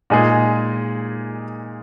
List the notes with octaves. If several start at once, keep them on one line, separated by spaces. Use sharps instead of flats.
A#2 G#3 D#4 G#4 G#5